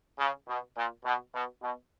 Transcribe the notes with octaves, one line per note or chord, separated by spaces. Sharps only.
C#3
B2
A#2
B2
B2
B2